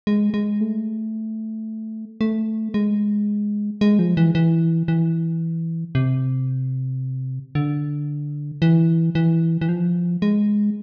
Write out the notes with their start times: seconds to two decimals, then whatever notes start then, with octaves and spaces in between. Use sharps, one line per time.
0.07 G#3
0.34 G#3
0.61 A3
2.21 A3
2.74 G#3
3.81 G#3
3.99 F3
4.17 E3
4.35 E3
4.88 E3
5.95 C3
7.55 D3
8.62 E3
9.15 E3
9.61 E3
9.69 F3
10.22 G#3